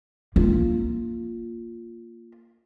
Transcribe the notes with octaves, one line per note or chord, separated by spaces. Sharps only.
A#3 F4